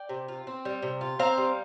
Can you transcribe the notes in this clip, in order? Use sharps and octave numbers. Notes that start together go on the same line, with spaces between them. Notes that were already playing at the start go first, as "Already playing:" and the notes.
Already playing: D5 G5
C3
F4
C4
G3
C3
F4
C4 F5 A#5
G3